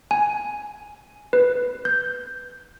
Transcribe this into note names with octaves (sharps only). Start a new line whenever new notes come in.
G#5
B4
G6